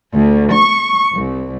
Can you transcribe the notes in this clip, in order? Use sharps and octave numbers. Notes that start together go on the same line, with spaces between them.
D2
C#6
C2